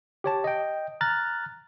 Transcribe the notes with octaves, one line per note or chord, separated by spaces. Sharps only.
G4 C#5 A5
D#5 G5
A#5 F6 F#6 A6